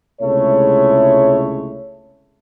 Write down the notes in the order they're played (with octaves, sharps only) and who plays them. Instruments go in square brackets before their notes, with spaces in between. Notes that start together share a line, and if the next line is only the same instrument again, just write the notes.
[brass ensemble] C#2 C3 G#3 A3 E4 C#5